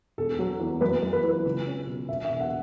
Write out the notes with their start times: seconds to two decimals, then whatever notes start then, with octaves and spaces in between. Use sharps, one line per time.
0.18 E1 A4
0.39 F#3
0.60 E2
0.81 F#2 B4
1.02 F#2
1.13 B4
1.23 E3
1.29 B4
1.45 C#2
1.67 C#4
1.87 B2
2.09 E1 E5
2.25 E5
2.30 E1
2.41 F#5